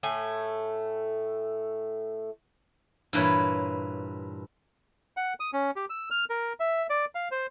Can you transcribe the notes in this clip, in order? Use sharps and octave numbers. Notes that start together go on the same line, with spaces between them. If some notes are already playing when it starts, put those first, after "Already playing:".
A2 A3 G#5
G2 A#2 E3 B4 C#5
F#5
D#6
C#4
G4
E6
F6
A#4
E5
D5
F5
C5